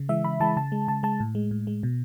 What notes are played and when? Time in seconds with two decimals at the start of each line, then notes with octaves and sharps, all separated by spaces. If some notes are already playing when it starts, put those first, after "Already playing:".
Already playing: C#3
0.09 E3 G#3 E5
0.24 C#3 B5
0.40 E3 G#3 A5
0.56 C#3 A5
0.72 G#3
0.88 C#3 A5
1.03 G#3 A5
1.20 A2
1.35 G#3
1.51 A2
1.67 G#3
1.83 B2